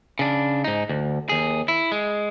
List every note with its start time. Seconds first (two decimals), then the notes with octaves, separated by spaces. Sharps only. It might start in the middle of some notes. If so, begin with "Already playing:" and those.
0.19 C#3 D4
0.64 G#2 D#4
0.89 D2
1.29 D#2 G#4
1.68 E4
1.92 G#3